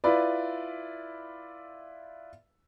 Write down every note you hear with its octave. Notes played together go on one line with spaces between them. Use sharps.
E4 F4 B4 D5